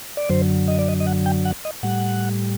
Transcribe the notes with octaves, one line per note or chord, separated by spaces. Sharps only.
D5
F#2 D3 F#3 C5
D#5
D5
D#5
D#5
F#5
G5
F#5
D#5
A2 G3 F#5